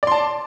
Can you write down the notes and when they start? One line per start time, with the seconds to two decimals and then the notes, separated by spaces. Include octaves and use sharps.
0.03 D5
0.07 C6
0.12 A5